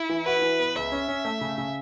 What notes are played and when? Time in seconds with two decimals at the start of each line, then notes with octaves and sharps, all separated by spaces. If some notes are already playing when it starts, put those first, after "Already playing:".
Already playing: E4
0.09 E3
0.26 F#4 B4
0.42 E3
0.59 B3
0.76 C#2 E5
0.92 C#4
1.08 C#4
1.25 A3
1.41 C#3
1.58 C#3